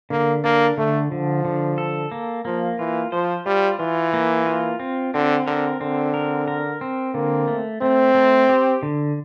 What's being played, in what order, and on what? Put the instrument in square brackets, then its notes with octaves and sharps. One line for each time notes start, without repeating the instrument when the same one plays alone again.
[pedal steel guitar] D3 [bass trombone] A#3
[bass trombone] A#3 [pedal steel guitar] D4
[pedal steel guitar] D3 [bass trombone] A3
[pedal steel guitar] D3 [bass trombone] F3
[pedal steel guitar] D3
A4
A#3
[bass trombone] F3 [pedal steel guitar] A#3
[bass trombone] E3 [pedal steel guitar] F4
[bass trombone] F3 [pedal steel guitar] C5
[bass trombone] G3 [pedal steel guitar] F4
[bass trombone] E3 [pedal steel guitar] F4
[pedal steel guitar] A#3
F4
C4
[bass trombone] D3 [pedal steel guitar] C4
[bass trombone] D3 [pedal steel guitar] A#4
[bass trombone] D3 [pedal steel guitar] C4
[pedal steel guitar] A#4
A#4
C4
[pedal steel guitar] D3 [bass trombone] A#3
[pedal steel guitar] A3
[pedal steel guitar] A3 [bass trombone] C4
[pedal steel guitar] A3
G4
D3